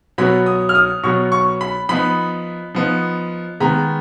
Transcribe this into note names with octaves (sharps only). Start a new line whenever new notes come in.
B2 F#3 B3 B5
D#6
F6
D#6
B2 F#3 B3 C#6
C#6
B5
F3 B3 D#4 B5
F3 B3 D#4
D#3 G#3 B3 A#5